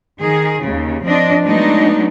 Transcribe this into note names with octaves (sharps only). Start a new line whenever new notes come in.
D#3 G#4
D#2 C#3
F3 C4 D4 D#5
F#3 G#3 A3 B3 D4 D#4